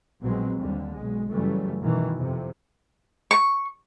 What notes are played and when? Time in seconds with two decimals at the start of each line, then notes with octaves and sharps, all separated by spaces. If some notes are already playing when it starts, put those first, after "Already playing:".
0.21 A#1 B2 F#3 G#3 C4
0.58 D#2 D3 G3
0.93 B1 G#3
1.31 F#2 C#3 E3 G3 A3
1.82 B2 D#3 E3
2.17 F2 C3
3.31 C#6